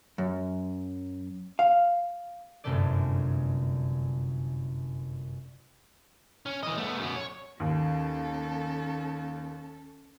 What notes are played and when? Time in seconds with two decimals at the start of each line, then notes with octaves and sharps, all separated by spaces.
0.18 F#2
1.59 F5
2.64 G1 F#2 C3 A3 A4 D5
6.46 C#4
6.63 E3 D#5
6.77 A3 B3
6.98 F#2 B3
7.16 C#5
7.60 D#2 C#4 A4